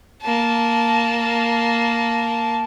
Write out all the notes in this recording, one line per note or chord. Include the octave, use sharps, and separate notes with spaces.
A#3 A5